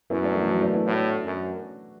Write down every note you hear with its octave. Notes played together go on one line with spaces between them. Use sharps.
F#2 B3 E4
A3 D4
E3 A3
F#3 B3
A3 D4
B3 E4
A2 D4 F#4
F#2